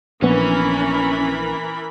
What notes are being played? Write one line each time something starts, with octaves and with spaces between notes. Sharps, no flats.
A#1 E3 B3 C#4 A#4 B5